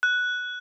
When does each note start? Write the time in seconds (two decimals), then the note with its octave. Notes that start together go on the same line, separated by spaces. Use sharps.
0.03 F#6